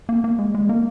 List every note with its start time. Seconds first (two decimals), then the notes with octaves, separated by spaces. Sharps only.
0.09 A#3
0.24 A#3
0.39 G#3
0.54 G#3
0.69 A#3